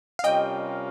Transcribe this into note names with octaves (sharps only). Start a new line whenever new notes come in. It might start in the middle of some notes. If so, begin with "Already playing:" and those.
F5
C3 G3 C#4 F4 A#4 D#5 G5